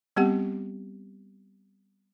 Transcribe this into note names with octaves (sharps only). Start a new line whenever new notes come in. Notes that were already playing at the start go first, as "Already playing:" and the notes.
G3 B3 C4 G4 F#5